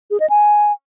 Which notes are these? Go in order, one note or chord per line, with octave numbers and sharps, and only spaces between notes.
G#4
D#5
G#5